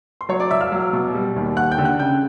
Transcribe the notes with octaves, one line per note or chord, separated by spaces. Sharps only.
C6
F#3 C#5 C#6
D5 D6
E1 E5 E6
F5 F6
F#3
B2
G3
D#2
D#2 F#5 F#6
G5 G6
D3
F#5 F#6
C#3 G5 G6